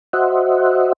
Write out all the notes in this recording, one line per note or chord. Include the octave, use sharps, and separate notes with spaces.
F#4 C5 D#5 E5 F#5